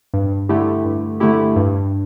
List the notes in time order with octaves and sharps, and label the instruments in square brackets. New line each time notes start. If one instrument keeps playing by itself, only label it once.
[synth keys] G2
D3 A3 E4 G4
G2
D3 A3 E4 G4
G2